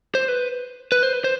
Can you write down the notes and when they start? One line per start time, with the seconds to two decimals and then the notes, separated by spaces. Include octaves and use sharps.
0.15 C5
0.28 B4
0.92 B4
1.03 C5
1.13 B4
1.24 C5